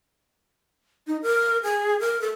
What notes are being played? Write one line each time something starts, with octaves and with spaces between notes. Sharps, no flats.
D#4
A#4
G#4
A#4
A4